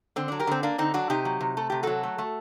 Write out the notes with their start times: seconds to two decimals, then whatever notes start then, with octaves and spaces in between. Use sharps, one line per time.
0.16 D3 C4
0.28 F#3 D4
0.39 G4 A#4
0.47 D3 C4
0.63 A#3 D4
0.78 D3 C4 D#4
0.94 F#3 D4 F#4
1.10 C3 D#4 G4
1.25 F#3
1.41 C3
1.57 A3 A4
1.70 C3 G4
1.83 F#3 F#4 A4
2.03 A3
2.18 A3